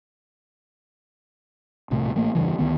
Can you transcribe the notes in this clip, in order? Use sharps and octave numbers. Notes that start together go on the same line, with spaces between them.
D#1 C2 A2 C3
A1 A3 A#3
E2 G2 C#3 E3
D2 D#3 B3